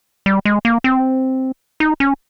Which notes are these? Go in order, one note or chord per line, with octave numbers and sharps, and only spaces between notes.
G3
G#3
A#3
C4
D#4
C#4